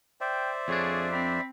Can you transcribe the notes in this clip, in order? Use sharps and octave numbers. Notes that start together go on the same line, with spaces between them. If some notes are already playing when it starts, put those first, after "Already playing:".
C5 D5 E5 G5
F2 D4 G#4 C#5
C4 B5